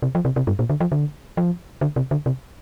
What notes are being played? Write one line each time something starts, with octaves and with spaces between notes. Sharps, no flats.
C3
F3
C3
C3
G2
A#2
D3
F3
D3
F3
D3
C3
D3
C3